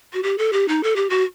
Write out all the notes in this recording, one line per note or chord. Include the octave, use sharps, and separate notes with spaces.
F#4
G4
A4
G4
D#4
A4
G4
F#4